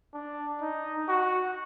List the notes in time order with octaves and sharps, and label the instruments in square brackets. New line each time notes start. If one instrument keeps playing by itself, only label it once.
[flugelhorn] D4
D#4
F#4